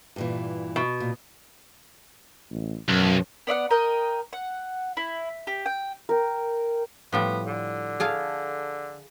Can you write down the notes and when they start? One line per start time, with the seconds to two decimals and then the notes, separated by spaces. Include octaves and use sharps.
0.16 G2 A#2 E3
0.76 B2
1.00 A#2
2.51 A1
2.88 B1 F#2
3.47 B3 D5 E5 F#5
3.71 A#4 D#5 G5
4.33 F#5
4.97 E4
5.47 G4
5.66 G5
6.09 A#4 G5
7.13 A2 F3 G3 B3
7.47 D3
8.00 G#4 A4 F5